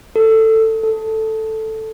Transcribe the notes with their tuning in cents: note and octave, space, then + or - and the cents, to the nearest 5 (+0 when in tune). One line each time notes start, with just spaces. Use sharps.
A4 +15
A4 +0